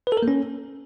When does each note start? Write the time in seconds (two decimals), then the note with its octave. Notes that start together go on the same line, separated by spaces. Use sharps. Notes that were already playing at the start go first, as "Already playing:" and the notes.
0.07 B4
0.12 A4
0.17 A#4
0.22 A#3
0.28 C#4